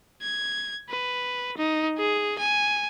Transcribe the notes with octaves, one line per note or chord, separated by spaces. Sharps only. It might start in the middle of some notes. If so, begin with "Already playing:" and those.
G#6
B4
D#4
G#4
G#5